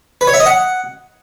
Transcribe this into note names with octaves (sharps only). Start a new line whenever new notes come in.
B4
C#5
E5
D#5
F#5